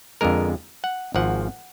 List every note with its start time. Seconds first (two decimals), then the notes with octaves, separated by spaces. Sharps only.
0.21 F2 D3 G#3 A#4
0.84 F#5
1.15 G#1 G#2 F3 F#5